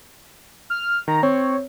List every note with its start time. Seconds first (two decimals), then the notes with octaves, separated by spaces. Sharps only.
0.70 F6
1.08 D#3 A#5
1.23 C4 C#5